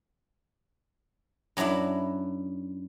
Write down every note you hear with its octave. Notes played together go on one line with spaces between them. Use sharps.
F#2 F#3 D4 E4 B5